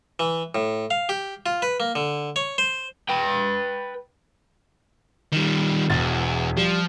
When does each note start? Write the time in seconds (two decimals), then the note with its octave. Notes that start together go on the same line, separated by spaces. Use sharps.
0.19 E3
0.55 A2
0.91 F5
1.09 G4
1.46 F4
1.62 B4
1.80 A#3
1.95 D3
2.36 C#5
2.58 C5
3.09 B4 G5
5.32 D#3 G3
5.90 E1 E2 A6
6.57 F3 G3